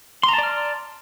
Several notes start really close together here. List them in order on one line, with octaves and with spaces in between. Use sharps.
C6 A#5 A5 D5 F6